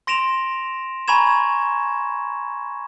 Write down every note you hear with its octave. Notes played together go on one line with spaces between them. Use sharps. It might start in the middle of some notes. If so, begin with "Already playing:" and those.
C6 A#6 D7 E7 F7
G#5 A#5 B5 C#6 G#6 E7